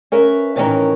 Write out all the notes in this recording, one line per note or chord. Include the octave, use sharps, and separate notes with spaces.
C#4 A#4 B4 E5
A2 C3 D#3 E3 C#4 A#4